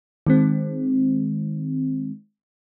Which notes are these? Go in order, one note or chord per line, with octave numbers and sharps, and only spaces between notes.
D#3 G#3 C4